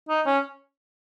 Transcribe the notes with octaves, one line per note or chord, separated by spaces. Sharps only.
D#4
C#4